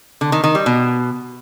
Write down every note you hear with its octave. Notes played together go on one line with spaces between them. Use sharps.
D3
D#3
D#3
G3
B2